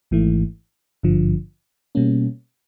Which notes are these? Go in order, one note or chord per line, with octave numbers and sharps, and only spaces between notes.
G#1 G#2 E3 A3
G#1 G2 D3 F3
B2 G3 A#3 C#4